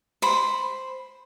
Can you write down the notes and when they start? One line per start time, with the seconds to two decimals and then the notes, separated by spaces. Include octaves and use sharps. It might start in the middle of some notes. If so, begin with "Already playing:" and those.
0.22 C5 B5